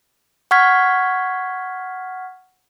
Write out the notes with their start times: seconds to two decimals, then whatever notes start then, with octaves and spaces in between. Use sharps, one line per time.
0.51 F#5 C#6 F6 G#6 B6